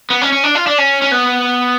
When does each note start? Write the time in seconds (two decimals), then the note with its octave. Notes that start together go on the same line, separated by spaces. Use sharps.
0.10 B3
0.21 C#4
0.32 C#4
0.44 D4
0.55 F4
0.67 D4
0.78 C#4
1.02 C#4
1.12 B3